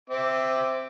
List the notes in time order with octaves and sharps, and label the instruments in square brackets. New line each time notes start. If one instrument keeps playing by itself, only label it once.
[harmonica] C4 E5 D6